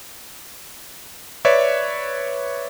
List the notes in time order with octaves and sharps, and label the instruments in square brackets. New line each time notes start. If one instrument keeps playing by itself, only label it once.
[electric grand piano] B4 C#5 D5 E5